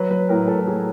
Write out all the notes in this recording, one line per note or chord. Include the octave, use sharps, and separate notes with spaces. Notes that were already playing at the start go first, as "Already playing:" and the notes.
Already playing: F#3 B4
F#3 B4
A2 A#4
A2 A4
A4
F#3 G#4